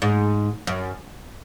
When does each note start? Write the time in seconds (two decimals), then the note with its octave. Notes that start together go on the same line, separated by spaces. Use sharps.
0.02 G#2
0.67 F#2